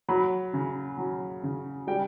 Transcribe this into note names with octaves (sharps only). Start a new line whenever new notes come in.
F#3 B5
C#3
F#3
C#3
G3 G5